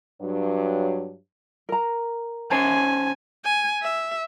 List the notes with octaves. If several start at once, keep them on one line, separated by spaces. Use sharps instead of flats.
G2 F#3
A#4 A#5
C#4 C5 G#5 A5
G#5
E5